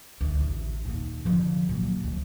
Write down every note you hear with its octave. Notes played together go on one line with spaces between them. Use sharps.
D2
A1
D#2 A#2
D3 F3
A#2 F#3
G1 D2